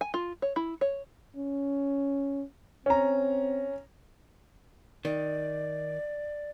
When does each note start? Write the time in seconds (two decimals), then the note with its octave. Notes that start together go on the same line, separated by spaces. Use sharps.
0.01 G#5
0.14 F4
0.42 C#5
0.56 E4
0.81 C#5
1.36 C#4
2.86 C4 C#4 A#5
5.05 D#3 D5